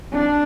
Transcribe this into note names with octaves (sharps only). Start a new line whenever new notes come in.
D4